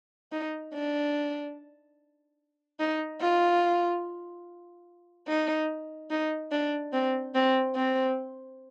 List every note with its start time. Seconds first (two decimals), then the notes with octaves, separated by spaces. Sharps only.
0.32 D#4
0.74 D4
2.79 D#4
3.21 F4
5.27 D#4
6.10 D#4
6.52 D4
6.92 C4
7.35 C4
7.75 C4